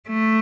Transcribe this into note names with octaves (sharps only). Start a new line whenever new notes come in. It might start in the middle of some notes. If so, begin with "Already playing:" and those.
A3